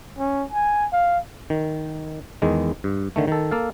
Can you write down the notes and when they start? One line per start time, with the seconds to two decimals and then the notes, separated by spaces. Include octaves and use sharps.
0.18 C#4
0.52 G#5
0.93 F5
1.50 D#3
2.42 E2 D#3 G#3
2.84 G2
3.16 D3 D#3 A3
3.28 D#3 A4
3.51 A#3 A4 F5